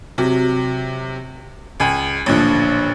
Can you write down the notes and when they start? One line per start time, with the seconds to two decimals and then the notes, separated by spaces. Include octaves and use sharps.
0.18 C3 F#3
1.80 C#2 G#5
2.26 A1 A#2 D3 F3